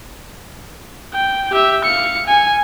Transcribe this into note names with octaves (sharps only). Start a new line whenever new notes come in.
G5
G4 E5
F5 C#7
G#5